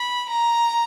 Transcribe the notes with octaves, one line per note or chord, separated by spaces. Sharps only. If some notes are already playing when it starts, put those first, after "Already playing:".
Already playing: B5
A#5